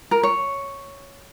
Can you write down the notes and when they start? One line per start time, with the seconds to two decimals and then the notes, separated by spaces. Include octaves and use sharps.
0.11 A#4
0.23 C#5